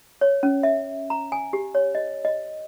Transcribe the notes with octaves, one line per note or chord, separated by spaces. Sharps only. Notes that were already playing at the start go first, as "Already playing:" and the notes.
C#5
C#4
E5
A#5
G#5
G4
C#5
D#5
D#5